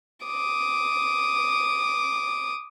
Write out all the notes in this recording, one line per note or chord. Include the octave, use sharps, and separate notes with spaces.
D6 D#6